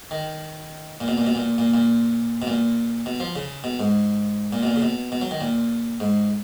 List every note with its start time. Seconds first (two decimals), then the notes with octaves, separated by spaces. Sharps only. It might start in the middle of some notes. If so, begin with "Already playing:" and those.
0.11 D#3
1.00 A#2
1.08 B2
1.18 A#2
1.26 B2
1.35 A#2
1.58 A#2
1.74 A#2
2.42 B2
2.47 A#2
3.06 B2
3.20 F3
3.36 C#3
3.64 B2
3.80 G#2
4.53 A#2
4.63 B2
4.67 A#2
4.76 C#3
4.82 B2
5.12 B2
5.21 F#3
5.31 D#3
5.41 A#2
6.00 G#2